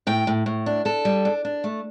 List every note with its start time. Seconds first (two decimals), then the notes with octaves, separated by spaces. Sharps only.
0.07 A2 G5
0.27 A2
0.46 A2
0.66 D4
0.85 D4 A4
1.05 G3
1.25 D4
1.45 D4
1.64 A3